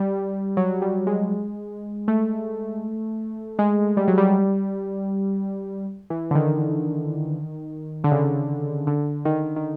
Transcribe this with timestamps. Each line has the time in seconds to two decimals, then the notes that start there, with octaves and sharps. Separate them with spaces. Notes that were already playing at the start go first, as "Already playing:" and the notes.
Already playing: G3
0.57 F#3
0.82 G3
1.07 G#3
2.08 A3
3.59 G#3
3.97 G3
4.08 F#3
4.18 G3
6.10 E3
6.31 D3
6.35 D#3
8.04 D3
8.12 C#3
8.87 D3
9.25 D#3
9.56 D#3